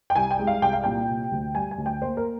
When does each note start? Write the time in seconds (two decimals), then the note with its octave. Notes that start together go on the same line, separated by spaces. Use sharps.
0.10 G5
0.15 C2 G#5
0.31 G5
0.39 G#3
0.47 F5
0.62 C2 G5
0.73 F5
0.84 A#2 G5
1.09 C3
1.32 D2
1.55 G3 G#5
1.71 G#5
1.78 D2
1.86 G5
2.02 A#3 C5
2.17 A#4